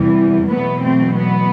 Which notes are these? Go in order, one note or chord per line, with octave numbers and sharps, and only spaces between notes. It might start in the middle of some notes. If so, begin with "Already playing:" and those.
Already playing: E2 C3 E3 G3
E2 B2 F#3 A3 B3
A3 C4
B3